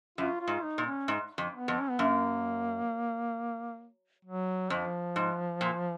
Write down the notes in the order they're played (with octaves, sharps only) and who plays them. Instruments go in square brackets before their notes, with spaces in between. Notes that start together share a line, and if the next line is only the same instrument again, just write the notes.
[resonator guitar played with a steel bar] F#2 [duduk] F4
[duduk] F4
[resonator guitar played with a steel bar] G#2
[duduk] D#4
[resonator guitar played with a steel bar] A#2
[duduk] C#4
[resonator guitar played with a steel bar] G#2
F2
[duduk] B3
[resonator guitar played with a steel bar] F2
[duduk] C#4
B3
[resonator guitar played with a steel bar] F#2 [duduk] A#3
[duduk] F#3
[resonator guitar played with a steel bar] F2 [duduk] F3
[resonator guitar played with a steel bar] G#2
A#2